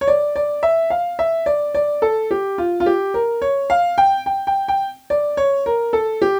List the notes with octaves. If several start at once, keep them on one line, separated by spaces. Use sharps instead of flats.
C#5
D5
D5
E5
F5
E5
D5
D5
A4
G4
F4
F4
G4
A#4
C#5
F5
G5
G5
G5
G5
D5
C#5
A#4
A4
G4